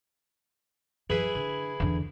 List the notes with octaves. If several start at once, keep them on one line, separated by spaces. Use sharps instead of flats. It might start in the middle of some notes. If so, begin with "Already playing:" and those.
F#2 E4 G#4 B4
D3
E2 D3